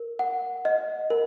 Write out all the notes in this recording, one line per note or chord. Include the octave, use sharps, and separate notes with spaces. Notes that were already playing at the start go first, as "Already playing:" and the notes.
Already playing: A#4
F#5
D#5
A#4